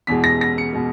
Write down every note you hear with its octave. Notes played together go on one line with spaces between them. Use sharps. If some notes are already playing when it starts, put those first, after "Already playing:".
E2 B2 G#3 B6
A#6
A#6
C#7
B2 G#3